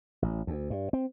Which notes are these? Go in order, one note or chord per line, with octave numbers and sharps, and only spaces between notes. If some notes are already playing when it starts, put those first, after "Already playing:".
A1
D2
G2
C4